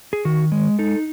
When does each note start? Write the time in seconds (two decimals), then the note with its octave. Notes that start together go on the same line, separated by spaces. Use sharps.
0.13 G#4
0.25 D#3 F#4
0.52 G#3
0.79 D#4 A4